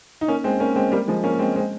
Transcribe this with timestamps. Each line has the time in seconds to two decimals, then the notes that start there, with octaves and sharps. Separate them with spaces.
0.21 D#4
0.28 A#3 C#4
0.44 G#3 C4
0.60 A#3 C#4
0.76 G#3 C4
0.92 G3 A#3
1.08 F3 G#3
1.23 A#3 C#4
1.39 G#3 C4
1.56 G#3 C4